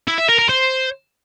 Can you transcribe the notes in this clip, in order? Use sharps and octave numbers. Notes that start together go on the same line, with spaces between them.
E4
E5
A#4
A#4
C5